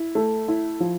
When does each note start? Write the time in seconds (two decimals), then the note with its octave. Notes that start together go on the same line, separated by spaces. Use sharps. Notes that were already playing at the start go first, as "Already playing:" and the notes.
Already playing: E4
0.15 A3
0.48 E4
0.80 F3